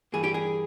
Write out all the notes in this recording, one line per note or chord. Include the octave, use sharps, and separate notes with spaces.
G2 E3 G3 A#3 G#4
G4
G#4